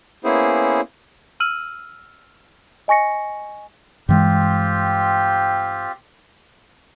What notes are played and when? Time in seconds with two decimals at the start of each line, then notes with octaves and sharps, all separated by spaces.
0.24 A#3 B3 C#4 E4 G#4 C5
1.40 E6 F6 D#7 F#7
2.88 D#5 G#5 C#6 A#6 C#7
4.09 G2 E3 G#3 C4 F4 G4